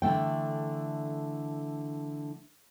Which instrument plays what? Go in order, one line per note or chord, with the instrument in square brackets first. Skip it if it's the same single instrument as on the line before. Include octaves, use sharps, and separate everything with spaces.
[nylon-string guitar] D3 E3 A3 G5